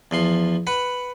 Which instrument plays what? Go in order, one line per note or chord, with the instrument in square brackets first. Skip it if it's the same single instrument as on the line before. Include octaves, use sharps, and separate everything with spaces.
[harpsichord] E2 F3 C6
B4 F#5 B5